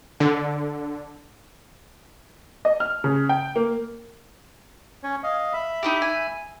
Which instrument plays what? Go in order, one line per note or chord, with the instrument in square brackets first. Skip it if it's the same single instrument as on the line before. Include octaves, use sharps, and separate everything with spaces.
[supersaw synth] D3
[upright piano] D#5
F6
C#3
G5
A#3
[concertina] C#4 C#5
D#5 F5
E5 B5
[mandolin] D#4 E4 G4
G#5